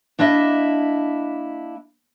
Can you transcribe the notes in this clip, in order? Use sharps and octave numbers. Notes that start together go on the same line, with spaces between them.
A#3 D4 E4 D#5 E5